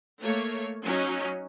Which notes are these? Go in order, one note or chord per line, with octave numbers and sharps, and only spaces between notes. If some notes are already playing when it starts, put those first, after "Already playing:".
A3 A#3 C#5
F#3 C#4 D#4